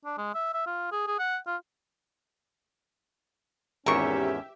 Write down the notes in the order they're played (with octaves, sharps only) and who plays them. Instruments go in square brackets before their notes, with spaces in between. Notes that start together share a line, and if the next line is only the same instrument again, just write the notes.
[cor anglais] D4
G#3
E5
E5
F4
G#4
G#4
F#5
F4
[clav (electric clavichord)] G#1 E2 [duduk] C#4 [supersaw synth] G4 E5 [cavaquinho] A#4 C#6